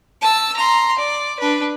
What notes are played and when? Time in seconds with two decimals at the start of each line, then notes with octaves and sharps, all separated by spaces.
0.22 A5 E6
0.56 A#5 C6
0.98 D5
1.39 D4 B4